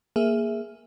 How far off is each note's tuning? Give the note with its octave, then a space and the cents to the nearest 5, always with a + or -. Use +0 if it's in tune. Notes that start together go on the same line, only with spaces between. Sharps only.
A#3 +0 G#4 +0 E5 +0